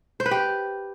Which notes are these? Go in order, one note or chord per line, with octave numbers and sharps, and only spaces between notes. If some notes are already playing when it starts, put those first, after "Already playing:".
C5
B4
G4